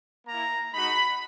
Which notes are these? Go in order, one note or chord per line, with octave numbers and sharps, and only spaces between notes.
A#3 E4 A#5
G#3 D#4 F#4 B5